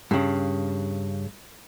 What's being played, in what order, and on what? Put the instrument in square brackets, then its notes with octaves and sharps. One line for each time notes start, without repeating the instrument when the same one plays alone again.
[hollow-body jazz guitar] G2 C#3